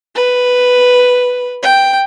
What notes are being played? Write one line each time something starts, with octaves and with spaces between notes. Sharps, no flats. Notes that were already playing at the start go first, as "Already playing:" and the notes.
B4
G5